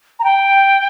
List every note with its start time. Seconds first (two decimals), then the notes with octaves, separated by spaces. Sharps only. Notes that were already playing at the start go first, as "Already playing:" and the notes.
0.19 A#5
0.24 G5